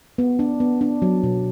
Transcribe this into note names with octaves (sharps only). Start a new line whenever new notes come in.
B3
D4
B3
D4
F#3
B2